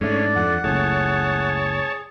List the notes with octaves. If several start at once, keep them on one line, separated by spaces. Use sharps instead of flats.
G#2 G#3 A3 C#4 D4 A4 D5
F2 F#5
F#1 C#2 A2 G#4 C#5 A5